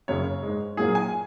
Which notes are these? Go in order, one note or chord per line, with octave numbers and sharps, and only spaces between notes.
F#2 C#3 A#3 C#5
G#2 G#3
A#2 F#3 A#3 G#4
G#5